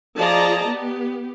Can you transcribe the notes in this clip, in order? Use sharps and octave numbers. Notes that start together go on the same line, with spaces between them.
F3 G#4 D5 D#5 A5 A#5
B3 G4